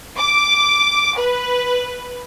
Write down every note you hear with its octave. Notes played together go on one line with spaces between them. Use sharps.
D6
B4